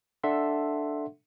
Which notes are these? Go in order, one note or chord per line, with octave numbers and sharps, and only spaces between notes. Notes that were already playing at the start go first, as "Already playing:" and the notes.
D4 A4 E5 F#5 C6